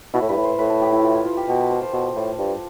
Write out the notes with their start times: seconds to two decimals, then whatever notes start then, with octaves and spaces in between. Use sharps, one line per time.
0.14 B2 E4
0.22 A2
0.29 G2 B4
0.37 A2
0.44 C5
0.59 A2 B4
0.70 A4
0.81 G4
0.92 E4
1.03 F4
1.15 E4
1.25 F4
1.37 G4
1.48 B2 G4
1.60 A4
1.71 C5
1.81 C5
1.93 B2
2.16 A2
2.38 G2